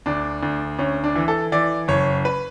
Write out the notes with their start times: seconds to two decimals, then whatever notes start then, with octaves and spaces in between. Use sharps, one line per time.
0.06 D2 D4
0.43 D2
0.79 D2 C#4
1.04 D4
1.16 E3
1.28 A4
1.52 E3 D5
1.88 F#1 C#5
2.25 B4